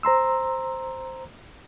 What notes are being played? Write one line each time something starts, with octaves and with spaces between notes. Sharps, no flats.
C5 A#5 C6 E6